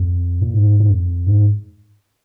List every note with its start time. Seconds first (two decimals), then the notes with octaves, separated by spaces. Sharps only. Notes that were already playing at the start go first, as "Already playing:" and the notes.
Already playing: F2
0.41 A#2
0.54 G#2
0.80 G#2
0.90 F2
1.27 G#2